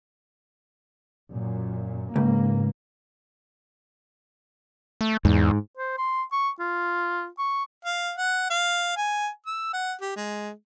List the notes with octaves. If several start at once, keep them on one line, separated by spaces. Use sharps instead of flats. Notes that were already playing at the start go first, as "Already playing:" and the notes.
F#2 A#2
C#2 G#2 A#3
A3
E2 G#2
C5
C6
C#6
F4
C#6
F5
F#5
F5
G#5
E6
F#5
G4
G#3